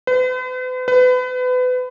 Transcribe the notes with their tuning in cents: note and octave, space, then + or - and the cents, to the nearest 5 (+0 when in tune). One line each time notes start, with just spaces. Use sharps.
B4 +45
B4 +30